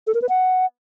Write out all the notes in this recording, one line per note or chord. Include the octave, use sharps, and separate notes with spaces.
A4
A#4
B4
F#5